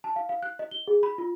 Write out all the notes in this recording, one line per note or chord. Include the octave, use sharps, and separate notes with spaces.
A5
F5
F5
F#6
D#5
G7
G#4
B5
F4